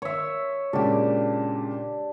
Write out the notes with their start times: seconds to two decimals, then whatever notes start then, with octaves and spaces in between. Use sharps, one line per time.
0.02 C#5 E5
0.73 A#2 C#3 G#3 D4 G4